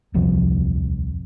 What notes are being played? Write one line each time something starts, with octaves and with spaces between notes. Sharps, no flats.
D#1 C2 F2 F3